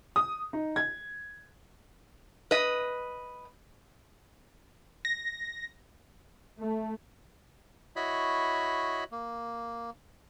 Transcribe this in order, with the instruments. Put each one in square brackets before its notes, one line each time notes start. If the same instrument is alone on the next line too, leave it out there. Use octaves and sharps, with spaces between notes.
[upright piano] D#6
D#4
G#6
[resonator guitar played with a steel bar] B4 D#5
[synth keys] A#6
[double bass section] A3
[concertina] E4 F#4 C#5 D#5 B5
A#3